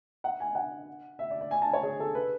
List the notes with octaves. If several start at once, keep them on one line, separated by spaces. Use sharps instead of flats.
F#5
G#5
F#5
E5
D5
D5
G#5
A5
C#5
G#4
A4
B4